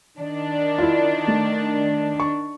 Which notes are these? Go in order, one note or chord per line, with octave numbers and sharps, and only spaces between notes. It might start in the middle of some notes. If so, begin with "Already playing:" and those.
D#3 D4
E4 F4
A3
C#6